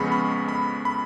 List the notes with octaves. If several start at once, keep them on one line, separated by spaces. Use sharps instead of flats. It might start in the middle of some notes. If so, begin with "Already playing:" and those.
Already playing: F2 C#3 G#3 B3 B5 C#6
B5
B5
B5